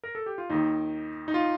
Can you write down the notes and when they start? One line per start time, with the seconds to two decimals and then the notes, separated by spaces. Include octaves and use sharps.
0.04 A#4
0.15 A4
0.26 G4
0.38 F4
0.50 D#2 D#3 D#4
1.28 D#4
1.34 F4